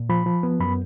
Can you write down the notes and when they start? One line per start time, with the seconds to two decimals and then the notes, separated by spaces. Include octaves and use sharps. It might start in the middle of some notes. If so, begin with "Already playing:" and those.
Already playing: A#2
0.09 F3 B5
0.26 F3
0.43 B3
0.60 F#2 B5